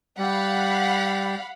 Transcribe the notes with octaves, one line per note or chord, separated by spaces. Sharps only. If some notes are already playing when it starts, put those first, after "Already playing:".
G3 F5 F#5 B5